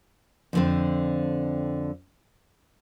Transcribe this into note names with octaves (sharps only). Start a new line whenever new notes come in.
F2 D3 C4